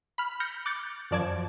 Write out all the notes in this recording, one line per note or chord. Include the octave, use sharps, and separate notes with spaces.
B5 F6
F6 G6 A#6 C#7
D6 F#6 G6 A6 C#7
F#2 F3 D5 A5 D6 G#6